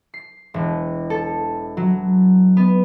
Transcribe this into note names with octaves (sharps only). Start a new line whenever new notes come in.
C7
E1
A4
F#3
B3